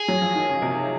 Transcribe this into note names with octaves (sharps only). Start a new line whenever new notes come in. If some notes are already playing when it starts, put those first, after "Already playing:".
Already playing: G#4
F#3
F3
D#3
C#3
C3